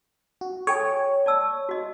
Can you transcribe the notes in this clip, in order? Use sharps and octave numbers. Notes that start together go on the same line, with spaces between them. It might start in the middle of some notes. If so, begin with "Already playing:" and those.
F#4
A4 C#5 G5 G#5
D5 A5 E6
F#4 D#5